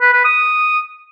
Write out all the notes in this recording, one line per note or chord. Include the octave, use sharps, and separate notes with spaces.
B4
B4
D#6